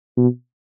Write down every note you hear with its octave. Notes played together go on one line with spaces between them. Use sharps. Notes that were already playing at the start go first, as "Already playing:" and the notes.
B2